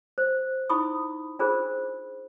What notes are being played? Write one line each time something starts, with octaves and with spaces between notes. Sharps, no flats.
C5
D#4 E4 B5 C#6 D#6
D4 F4 G#4 A#4 C5